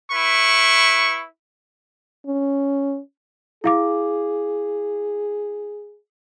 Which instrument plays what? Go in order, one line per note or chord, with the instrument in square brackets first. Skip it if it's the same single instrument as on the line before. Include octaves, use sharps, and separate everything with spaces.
[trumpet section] E4 B4 C#6
[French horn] C#4
[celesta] E4 F5 D6 [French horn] G#4